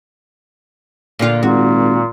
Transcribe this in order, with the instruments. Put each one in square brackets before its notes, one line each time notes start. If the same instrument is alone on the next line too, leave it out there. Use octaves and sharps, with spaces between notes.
[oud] A#2 D3 F4
[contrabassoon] G#1 [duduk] A#2 [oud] F#4